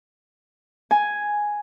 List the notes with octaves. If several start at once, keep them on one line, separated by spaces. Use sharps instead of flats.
G#5